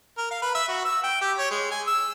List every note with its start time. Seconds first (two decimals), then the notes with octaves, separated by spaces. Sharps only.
0.18 A#4
0.31 F5
0.42 B4
0.55 E5
0.68 F#4
0.85 E6
1.03 G5
1.21 G4
1.38 C#5
1.51 G#3
1.71 G#5
1.87 E6